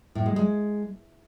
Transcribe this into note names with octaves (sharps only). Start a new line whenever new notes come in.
A2
G#3
G#3